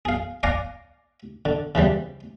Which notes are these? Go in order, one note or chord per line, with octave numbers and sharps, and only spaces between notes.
G#4 F5
D5 F5 F#5 G#5 A#5
D3
C#3 E3 F3 G3